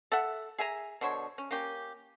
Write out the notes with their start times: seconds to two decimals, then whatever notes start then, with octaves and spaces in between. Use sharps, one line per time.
0.12 A4 E5 F#5
0.58 G#4 E5 G#5 A#5
1.01 B2 D3 C5 C#5
1.38 C#4
1.51 A#3 C#4 G4